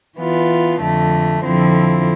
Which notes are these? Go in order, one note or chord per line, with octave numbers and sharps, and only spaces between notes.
E3 B3 F4
F2 D3 A3
F2 D3 F3 C4 E4